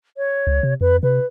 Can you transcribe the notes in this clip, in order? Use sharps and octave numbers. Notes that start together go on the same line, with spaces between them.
C#5
C#2
C3
F2 B4
C3 B4